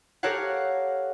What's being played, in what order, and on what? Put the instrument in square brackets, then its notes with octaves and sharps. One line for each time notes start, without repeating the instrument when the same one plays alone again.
[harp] G4 A4 A#4 C#5 F5 F#5